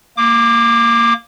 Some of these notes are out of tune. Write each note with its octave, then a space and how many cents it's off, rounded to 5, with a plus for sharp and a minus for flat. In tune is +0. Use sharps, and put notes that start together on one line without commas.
A#3 -10 D6 +15